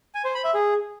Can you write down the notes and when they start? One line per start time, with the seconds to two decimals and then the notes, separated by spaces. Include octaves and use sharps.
0.15 G#5
0.25 C5
0.35 B5
0.44 E5
0.54 G#4